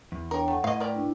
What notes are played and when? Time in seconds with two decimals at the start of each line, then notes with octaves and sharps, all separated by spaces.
0.12 E2
0.31 D4 A#4 C#5 G5
0.48 A3 F#5
0.64 A2 D#5 F5
0.80 A#4 B4 D5 G5
0.95 D4 E4